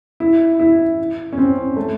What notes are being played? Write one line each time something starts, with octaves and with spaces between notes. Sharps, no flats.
E4
E4
C#4
C4
A3